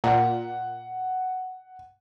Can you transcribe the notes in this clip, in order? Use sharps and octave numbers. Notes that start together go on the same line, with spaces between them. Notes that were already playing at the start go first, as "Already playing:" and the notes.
A#2 F#5